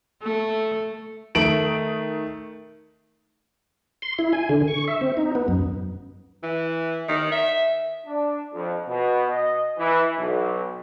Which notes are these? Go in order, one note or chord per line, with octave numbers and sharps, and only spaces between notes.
A3
D#3 A3 D7 F#7
C6
E4
G#5
D3
C#6
E5
C4
D#4
B3
F#2
E3
D#3
E5
D4
F2
B2
D#5
E3
B1